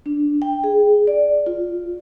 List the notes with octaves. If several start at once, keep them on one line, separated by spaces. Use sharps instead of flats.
D4
G5
G#4
D5
F4